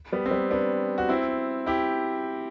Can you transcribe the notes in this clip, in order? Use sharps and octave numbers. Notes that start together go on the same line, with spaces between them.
G3 B3
C4
G3 B3
B3 D4
F#4
C4 E4
E4 G4